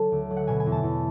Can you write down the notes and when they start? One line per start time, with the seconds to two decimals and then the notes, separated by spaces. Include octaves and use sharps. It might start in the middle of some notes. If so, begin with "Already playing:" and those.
Already playing: D3 F#3 A5
0.12 D2
0.30 F#3
0.37 F#5
0.47 B2 G#5
0.60 G#5
0.66 E2
0.72 A5
0.83 E2